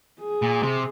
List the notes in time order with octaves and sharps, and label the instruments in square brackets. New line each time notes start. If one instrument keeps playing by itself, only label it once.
[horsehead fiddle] G#4
[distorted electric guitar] A#2
C3